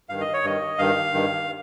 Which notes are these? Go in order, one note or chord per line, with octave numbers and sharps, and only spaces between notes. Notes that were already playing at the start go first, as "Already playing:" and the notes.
G2 D#3 F5
D#5
C#5
G2 D#3 D#5
G2 D#3 F5
G2 D#3